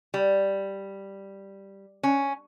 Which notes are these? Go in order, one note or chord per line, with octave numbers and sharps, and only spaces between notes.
G3
C#4